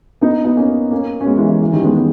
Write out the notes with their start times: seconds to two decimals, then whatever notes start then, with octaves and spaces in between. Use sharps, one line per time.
0.21 B3 D#4
0.45 B3 D#4
0.56 A#3 C#4
0.91 A#3 C#4
1.21 C#4
1.26 G#3 B3
1.38 E3 G#3
1.49 E3
1.61 E3
1.73 D#3 G3
1.79 C#4
1.84 G#3 B3
1.95 G#3 B3